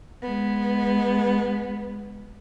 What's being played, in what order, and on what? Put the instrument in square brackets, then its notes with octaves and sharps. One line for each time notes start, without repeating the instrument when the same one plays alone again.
[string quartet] G#3 B3